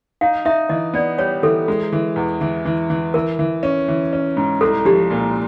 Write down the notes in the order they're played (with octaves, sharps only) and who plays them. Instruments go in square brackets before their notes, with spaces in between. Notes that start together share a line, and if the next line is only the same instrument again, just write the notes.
[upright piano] D#4 [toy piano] F5
[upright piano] D#4 [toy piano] E5
[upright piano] E3 [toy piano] D#5
[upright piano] B3 [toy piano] D5
[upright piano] G3 [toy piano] C#5
[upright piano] E3 [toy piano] A4
[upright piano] G#3
E3
E2
E3
E3
E3
[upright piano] E3 [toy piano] A#4
[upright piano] E3
C#4
E3
C#4
G#2
[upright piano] C2 [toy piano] A4
[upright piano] F3 [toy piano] G4
[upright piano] A#2